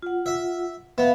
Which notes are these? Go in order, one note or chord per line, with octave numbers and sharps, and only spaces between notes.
F4 F#5
E5
B3 E5 F5